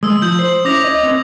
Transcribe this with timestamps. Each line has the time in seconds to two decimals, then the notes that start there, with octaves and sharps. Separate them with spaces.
0.03 G#3 D#6 E6
0.22 F3 D#6 G6 F#7
0.39 C5
0.65 C#4 E4 D6 A#6 F7
0.84 C#5 D#5
1.03 C4 B4